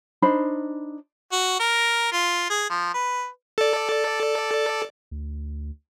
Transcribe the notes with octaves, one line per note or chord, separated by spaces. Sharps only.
D4 D#4 C5 B5
F#4
A#4
F4
G#4
F3
B4
A4 D5
D2